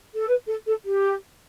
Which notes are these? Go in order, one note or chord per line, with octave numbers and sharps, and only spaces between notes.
A4
B4
A4
A4
G4